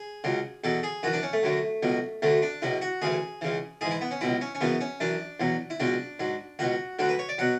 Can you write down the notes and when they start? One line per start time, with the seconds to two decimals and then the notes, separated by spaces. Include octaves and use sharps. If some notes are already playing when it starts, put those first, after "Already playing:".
Already playing: G#4
0.24 C#2 C#3 F#3
0.64 E2 B2 F#3 A4
0.83 G#4
1.03 F#2 E3 F#4
1.13 D4
1.23 C#4
1.33 A3
1.43 F#2 D3 F#3
1.83 C#2 B2 F#3
2.22 D2 D3 F#3 A3
2.42 D4
2.62 C#2 B2 F#3 E4
2.82 F#4
3.02 D2 C#3 E3 G#4
3.41 C#2 C#3 E3
3.81 G#2 E3 G#4
3.91 E4
4.01 B3
4.11 C#4
4.21 C#2 B2 F#3 E4
4.41 C#4
4.55 C#4
4.61 F#2 C#3 E3 B3
4.81 C#4
5.00 F#2 E3 D4
5.40 E2 B2 F#3
5.70 E4
5.80 C#2 B2 F#3 D4
6.19 G#2 F#3
6.59 C#2 B2 F#3 F#4
6.99 D2 D3 F#3 F#4
7.09 B4
7.19 C#5
7.29 D5
7.38 B2 F#3 F#5